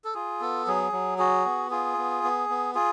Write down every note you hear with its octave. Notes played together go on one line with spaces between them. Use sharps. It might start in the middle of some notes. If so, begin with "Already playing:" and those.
A4
F4 G#4
B3 A4
F#3 G#4
F#3
F#4 G#4
B3
F4 G#4
B3
B3
B3
F4 G#4